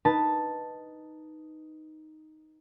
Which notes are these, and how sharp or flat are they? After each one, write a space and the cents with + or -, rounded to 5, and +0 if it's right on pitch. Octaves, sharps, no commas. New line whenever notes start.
D#4 +0 B4 -5 A5 +0